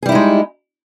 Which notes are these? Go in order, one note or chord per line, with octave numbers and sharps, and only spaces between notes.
G3 G#3 D#4 E4 G#4